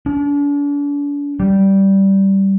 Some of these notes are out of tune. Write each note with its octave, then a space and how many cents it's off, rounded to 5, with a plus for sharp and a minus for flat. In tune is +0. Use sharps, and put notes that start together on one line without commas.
D4 -40
G3 -10